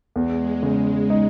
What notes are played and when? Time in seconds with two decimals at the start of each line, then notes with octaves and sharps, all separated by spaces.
0.15 E2 G#3
0.63 C#3
1.10 D#4